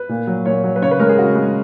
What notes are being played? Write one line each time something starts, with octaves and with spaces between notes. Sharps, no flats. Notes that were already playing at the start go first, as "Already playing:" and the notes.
Already playing: B4
A#2
F#3
A#2 C#5
F#3
B4
C#3 C#5
B4
G#3 A#4
G#4
C#3 F#4
G#3